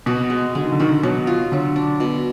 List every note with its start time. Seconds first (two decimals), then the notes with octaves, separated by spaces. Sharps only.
0.06 B2 F#4
0.30 G#3
0.55 D3 G#3
0.63 D#3
0.72 D3
0.80 D#3 F#4
0.89 D3
1.03 B2 F#3
1.27 F4
1.52 D3 F#3
1.76 D4
2.00 B2